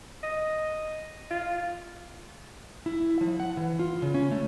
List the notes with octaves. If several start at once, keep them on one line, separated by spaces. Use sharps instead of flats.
D#5
F4
E4
F3
F#5
E3
F4
C#3
C#4
A3